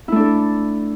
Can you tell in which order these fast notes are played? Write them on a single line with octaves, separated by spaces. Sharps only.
E4 A3 D4 A4